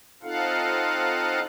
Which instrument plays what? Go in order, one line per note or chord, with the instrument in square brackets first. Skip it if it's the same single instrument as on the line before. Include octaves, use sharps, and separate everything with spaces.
[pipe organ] C4 D#4 F4 A4 F5 F#5